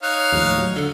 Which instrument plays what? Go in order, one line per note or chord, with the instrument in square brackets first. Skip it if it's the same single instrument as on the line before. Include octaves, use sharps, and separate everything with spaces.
[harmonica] D#4 C#5 F5 [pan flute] F#6
[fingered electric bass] D#2 A2 F3
F#3
[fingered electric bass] D3 [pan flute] A4